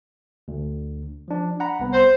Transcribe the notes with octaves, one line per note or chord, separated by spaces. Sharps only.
D2
F3 D4
F#5 A#5 B5
C2 B3
C5